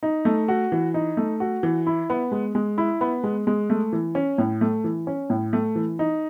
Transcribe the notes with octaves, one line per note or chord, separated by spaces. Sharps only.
D#4
A3
F#4
E3
D#4
A3
F#4
E3
E4
B3
G#3
G#3
E4
B3
G#3
G#3
A3
E3
C#4
A2
A3
E3
C#4
A2
A3
E3
D#4